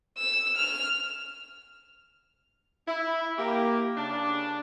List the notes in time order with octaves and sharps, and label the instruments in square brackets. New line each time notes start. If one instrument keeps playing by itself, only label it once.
[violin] E6
F6
[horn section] E4
A#3 G4
C#3 D4